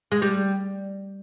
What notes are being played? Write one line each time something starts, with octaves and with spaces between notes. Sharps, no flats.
G#3
G3